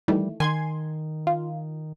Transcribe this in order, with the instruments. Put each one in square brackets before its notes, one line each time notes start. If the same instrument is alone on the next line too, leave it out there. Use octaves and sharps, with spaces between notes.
[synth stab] D#3 E3 A3 [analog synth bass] G3
[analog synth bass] D#3 [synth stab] G#5 C6 G#6
[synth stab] F4